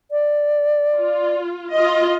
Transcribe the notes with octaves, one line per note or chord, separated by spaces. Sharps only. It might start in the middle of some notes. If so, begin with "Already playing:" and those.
D5
F4
F4 D#5